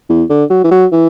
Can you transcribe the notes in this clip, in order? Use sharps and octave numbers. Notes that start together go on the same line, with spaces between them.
E2
D3
F#3
E3
F#3
E3